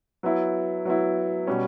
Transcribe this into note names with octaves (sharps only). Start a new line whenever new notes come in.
F#3 B3 E4
F#3 B3 E4
B2 G3 C#4